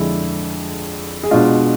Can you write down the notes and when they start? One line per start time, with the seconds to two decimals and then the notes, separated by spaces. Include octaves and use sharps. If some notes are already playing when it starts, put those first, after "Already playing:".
Already playing: F2 D3 G#3 E4 G#4
1.23 G#4
1.31 B2 G#3 D4 F4